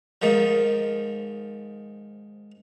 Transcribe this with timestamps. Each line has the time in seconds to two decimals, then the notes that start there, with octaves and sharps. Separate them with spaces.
0.22 G#2 D#3 F3